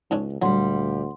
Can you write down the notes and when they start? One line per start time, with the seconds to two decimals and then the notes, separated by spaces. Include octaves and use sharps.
0.11 C#2 G#2 C#4 D4
0.42 D2 A#2 F#3 G3 F#5 C6